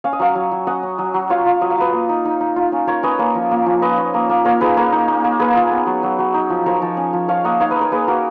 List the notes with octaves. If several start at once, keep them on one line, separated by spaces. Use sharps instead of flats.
C#4 F5
D#5
F#3 C#5 F5
F#3
F#3
C#4 D#5 F#5
C#4
F#3
F#3
F4 C#5 F5
F4
F#3 D#5
F5
F4 B4 D#5
A#3
D#4
D#4
D#4
F4
C#4
F4 A#4 C#5
C#4 B4 D#5
A#3 A#4 C#5
F3
A#3
F3
C#4 B4 D#5
C#4
A#3
A#3
A#3 A#4 C#5
D#4 G#4 B4
A#3 A#4 C#5
D#4
A#3
A#3
A#3 G#4 B4
F4
B3
F#3
F#3
F#3
D#4
F3
F3 A#4 C#5
F3
C#4
F3
F3 C#5 F5
A#3 D#5 F#5
D#4 C#5 F5
B4 D#5
D#4
A#4 C#5
A#3 G#4 B4
A#3 F#4 A#4